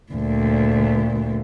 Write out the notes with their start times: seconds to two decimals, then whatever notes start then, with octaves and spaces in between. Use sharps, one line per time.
0.13 D2 A#2